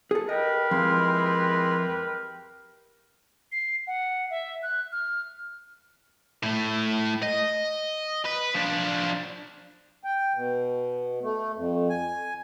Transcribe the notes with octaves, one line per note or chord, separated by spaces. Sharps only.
G#4 A4
G4 A#4 B4 D#5
F2 G#3 E4 C6
C7
F#5
E5
F#6
F6
A2 A3
D#5
B4
F3 D4
G5
B2
A3
F2
G#5